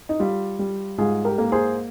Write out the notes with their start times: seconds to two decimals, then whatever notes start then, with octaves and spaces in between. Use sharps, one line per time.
0.09 D#4
0.20 G3 F4
0.59 G3
0.98 G#2 F4 G#4
1.25 G4 A#4
1.38 A#3
1.52 G#4 C5